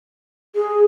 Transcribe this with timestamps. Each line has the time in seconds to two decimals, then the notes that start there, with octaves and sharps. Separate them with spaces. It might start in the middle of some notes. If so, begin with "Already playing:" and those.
0.55 G#4